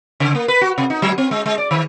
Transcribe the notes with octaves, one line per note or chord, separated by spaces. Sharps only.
C#3
A#3
B4
F#4
C3
D#4
F#3
C4
G#3
G#3
D5
D#3